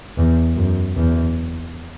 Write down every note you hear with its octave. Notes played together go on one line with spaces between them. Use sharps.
E2
F#2
E2